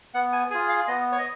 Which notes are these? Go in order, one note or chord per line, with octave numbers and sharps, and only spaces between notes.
B3 F#5
G#5
F4 G#4 G#5
F5
B3 D#5
C#5
D#5